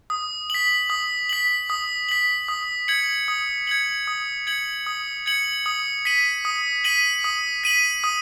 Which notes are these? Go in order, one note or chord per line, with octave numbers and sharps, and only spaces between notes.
D#6
B6 F#7
D#6
B6 F#7
D#6
B6 F#7
D#6
G#6 C#7 F#7
D#6
G#6 C#7 F#7
D#6
G#6 C#7 F#7
D#6
G#6 C#7 F#7
D#6
B6 D#7 F#7
D#6
B6 D#7 F#7
D#6
B6 D#7 F#7
D#6